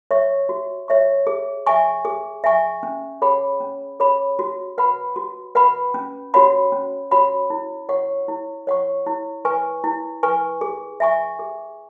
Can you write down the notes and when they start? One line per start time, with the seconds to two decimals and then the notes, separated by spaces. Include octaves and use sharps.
0.11 C#5 E5 C#6
0.49 F#4
0.88 C#5 E5 C#6
1.27 G#4
1.66 E5 G#5 C#6
2.05 G#4
2.44 E5 G#5 C#6
2.83 C#4
3.22 G#4 C#5 F#5 B5
3.60 C#4
4.00 G#4 C#5 F#5 B5
4.39 F#4
4.78 B4 F#5 B5
5.16 F#4
5.55 B4 F#5 B5
5.94 C#4
6.34 F#4 C#5 F#5 B5
6.72 C#4
7.11 F#4 C#5 F#5 B5
7.50 E4
7.89 C#5 F#5 C#6
8.28 E4
8.67 C#5 F#5 C#6
9.06 E4
9.45 B4 G#5 C#6
9.84 E4
10.23 B4 G#5 C#6
10.61 G#4
11.00 E5 G#5 C#6
11.39 G#4